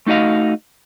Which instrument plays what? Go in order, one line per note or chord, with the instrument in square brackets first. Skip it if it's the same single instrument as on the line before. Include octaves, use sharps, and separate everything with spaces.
[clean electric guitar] A3 D#4 F#4 D#5 F5